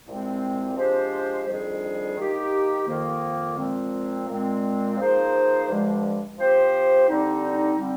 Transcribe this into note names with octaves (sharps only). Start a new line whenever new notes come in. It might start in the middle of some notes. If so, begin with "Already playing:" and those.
C2 A#2 G#3 C4
F3 G#3 D4 G4 C5
F2 D#3 G3 D4 G#4
D#3 A#3 D#4 G4
F2 D#3 A#3
A#2 F3 G#3 C4
A#2 G#3 C4
F3 A#3 D#4 G#4 C5
G2 D3 F3 G#3
F3 C4 G4 C5
D3 G3 C4 D#4
D3 G3 C4